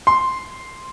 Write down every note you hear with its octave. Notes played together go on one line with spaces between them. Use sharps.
C6